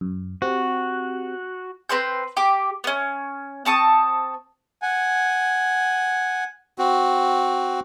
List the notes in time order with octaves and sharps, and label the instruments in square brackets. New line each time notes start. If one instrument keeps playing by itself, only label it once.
[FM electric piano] F#2
[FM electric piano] C4 G4 [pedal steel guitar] F#4
[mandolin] C4 B4 C6 G6
G4 D6
B3 C#4
C4 A5 C#6 D#6
[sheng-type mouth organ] F#5 G#5
[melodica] C4 F#4